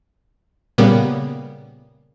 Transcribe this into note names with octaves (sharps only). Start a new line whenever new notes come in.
A#2 C#3 G3 A#3 B3